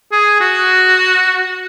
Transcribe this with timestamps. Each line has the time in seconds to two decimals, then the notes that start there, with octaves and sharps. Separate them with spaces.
0.12 G#4
0.41 F#4